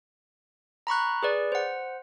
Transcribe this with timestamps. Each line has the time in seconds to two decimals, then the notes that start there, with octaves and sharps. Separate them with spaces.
0.87 A#5 B5 C#6 F#6
1.23 G#4 B4 D5
1.52 C5 F#5